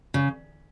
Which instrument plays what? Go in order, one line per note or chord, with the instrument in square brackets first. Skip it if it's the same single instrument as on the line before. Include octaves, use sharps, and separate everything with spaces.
[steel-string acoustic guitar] C#3